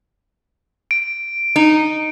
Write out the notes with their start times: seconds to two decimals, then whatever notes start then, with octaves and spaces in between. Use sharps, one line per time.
0.91 D7
1.56 D#4